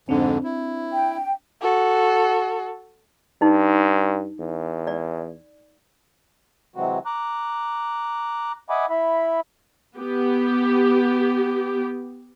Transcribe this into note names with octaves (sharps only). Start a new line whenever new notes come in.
F2 G#2 D3 C4 D4
E4
G5
F#4 A4
G2 D#4
E2
D5
C3 E3 F#3 G#3 C4 F#4
A#5 D6 F#6
D#5 E5 F#5 G#5 B5 D6
E4 E5 B5
B3 G4